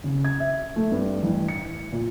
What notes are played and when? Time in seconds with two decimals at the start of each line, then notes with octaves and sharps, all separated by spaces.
0.04 C#3
0.25 G#6
0.40 E5
0.76 A3
0.92 G2
1.23 A1
1.48 C#7
1.92 A#2